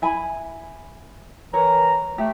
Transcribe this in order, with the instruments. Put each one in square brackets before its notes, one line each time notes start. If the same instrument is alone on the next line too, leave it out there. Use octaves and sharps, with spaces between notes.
[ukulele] E4 G#5 B5
[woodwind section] E3 A#4 A#5 [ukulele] C#5
[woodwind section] A3 [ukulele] G4